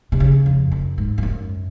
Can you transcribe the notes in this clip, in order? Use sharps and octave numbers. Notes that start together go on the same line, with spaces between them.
C3
C#3
F2
F#2
G#2
F2
F#2